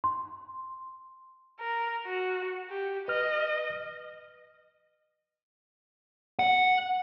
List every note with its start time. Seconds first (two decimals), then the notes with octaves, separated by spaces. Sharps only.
0.04 C6
1.60 A#4
2.05 F#4
2.70 G4
3.08 B4 D#5 F6
6.39 F#5